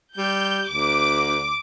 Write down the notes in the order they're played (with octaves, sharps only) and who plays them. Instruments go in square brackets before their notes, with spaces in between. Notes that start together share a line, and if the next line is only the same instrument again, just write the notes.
[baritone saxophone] G3 [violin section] G6
[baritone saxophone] D2 [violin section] D6